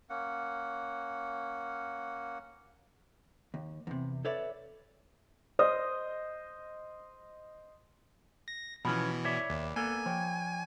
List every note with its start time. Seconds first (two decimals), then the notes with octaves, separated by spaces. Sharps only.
0.10 A#3 C#4 F#5
3.54 D#2
3.87 E2 C3
4.25 A4 B4 C#5 D5 E5
5.59 C5 D#5 D#6
8.48 A#6
8.85 B2 E3 F3 B3 C#4 B5
9.25 C#5 D5 E5
9.50 D#2
9.76 A#3 B3 A4 G#5
10.06 F3 C#5 G5